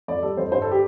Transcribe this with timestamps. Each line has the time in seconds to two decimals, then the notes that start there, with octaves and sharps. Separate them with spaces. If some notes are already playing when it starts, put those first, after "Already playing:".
0.08 F2 D5
0.23 G3 A4
0.37 F2 C5
0.52 G2 C5
0.62 A4
0.71 G4